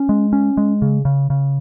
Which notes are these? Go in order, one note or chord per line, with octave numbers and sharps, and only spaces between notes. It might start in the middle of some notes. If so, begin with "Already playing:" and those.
Already playing: C#4
G#3
C#4
G#3
C#3
C#3
C#3